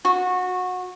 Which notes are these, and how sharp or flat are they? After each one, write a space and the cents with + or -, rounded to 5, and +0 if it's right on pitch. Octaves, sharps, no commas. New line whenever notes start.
F#4 -20